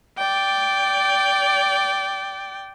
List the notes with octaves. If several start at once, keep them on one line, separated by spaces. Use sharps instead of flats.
D5 G5